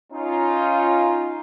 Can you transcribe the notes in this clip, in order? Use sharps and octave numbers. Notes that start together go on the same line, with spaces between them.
C#4 D#4 F4